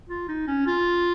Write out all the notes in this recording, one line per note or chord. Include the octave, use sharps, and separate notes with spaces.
F4
D#4
C#4
F4